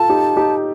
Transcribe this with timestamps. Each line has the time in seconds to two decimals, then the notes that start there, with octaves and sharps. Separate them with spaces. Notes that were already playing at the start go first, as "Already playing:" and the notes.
Already playing: F4 A4 A5
0.09 D#4 G4
0.36 D#4 G4